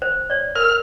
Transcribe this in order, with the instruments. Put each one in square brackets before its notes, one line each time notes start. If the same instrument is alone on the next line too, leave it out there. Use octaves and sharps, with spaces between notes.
[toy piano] C5
C#5 D5
[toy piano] A#4 [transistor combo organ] F6